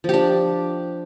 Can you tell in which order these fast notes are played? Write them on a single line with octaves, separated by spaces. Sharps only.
F3 G4 D4